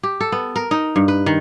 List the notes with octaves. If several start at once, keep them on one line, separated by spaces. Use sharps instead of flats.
G4
A4
B3
A#4
D#4
G2
B4
D#3